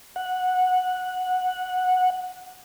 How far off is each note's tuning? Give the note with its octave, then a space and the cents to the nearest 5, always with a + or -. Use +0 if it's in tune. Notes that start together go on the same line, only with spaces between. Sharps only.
F#5 -10